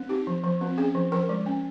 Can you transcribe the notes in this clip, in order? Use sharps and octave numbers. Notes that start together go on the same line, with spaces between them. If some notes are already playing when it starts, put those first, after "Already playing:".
Already playing: C4
D#4 G4
F3
F3
C4
C#4 G#4
F3
F3 A#4
G#3
C#4